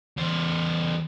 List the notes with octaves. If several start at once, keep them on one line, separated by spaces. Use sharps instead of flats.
E2 C5